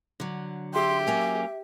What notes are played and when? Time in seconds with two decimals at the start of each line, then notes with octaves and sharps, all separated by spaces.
0.20 D3 F#3
0.74 G4 E5 C6
1.07 F#3 A#3 C#4 G#5